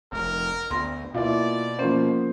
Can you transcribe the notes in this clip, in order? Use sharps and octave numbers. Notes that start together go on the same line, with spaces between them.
F1 A#4
D2 B3 C6 A#6
B2 A#3 E4 F4 D5
F3 A#3 B3 C#4 C5